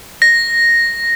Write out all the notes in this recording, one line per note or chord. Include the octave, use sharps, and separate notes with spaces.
A#6